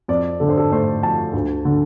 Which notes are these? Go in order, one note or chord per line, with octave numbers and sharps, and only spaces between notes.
F2 D5
D3 A4
C5
A4
A3 C5
F3 A5
D2
D3